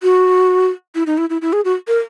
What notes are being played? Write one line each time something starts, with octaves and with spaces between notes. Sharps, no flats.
F#4
E4
D#4
E4
E4
E4
G#4
F#4
A#4